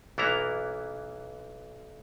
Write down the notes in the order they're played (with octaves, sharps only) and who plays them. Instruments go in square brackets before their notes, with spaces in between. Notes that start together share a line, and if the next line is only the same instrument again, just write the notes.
[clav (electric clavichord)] B1 E3 A#3 B3 E4 A#5